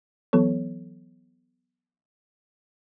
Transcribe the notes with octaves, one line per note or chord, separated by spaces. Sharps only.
E3 F#3 B3 A4 C#5